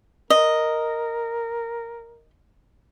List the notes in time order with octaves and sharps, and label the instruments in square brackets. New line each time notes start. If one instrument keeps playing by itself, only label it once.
[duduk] A#4 [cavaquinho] D#5